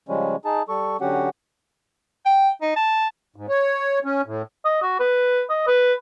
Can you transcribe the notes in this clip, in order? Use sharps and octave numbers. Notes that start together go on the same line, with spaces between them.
C#3 F3 G3 G#3 C#4
D#4 G#4 A5
G3 A4 C#6
D3 F#3 C#4 F#4 G4 F#5
G5
D#4
A5
G#2
C#5
C#4
A2
D#5
F#4
B4
D#5
B4